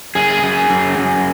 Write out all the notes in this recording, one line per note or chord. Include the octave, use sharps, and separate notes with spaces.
F#2 G#4
F#2
F#2
F#2